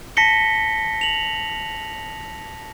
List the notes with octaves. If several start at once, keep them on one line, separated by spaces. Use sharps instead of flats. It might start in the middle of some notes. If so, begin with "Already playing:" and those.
A5 A#6 B6 C#7 G7
F7 F#7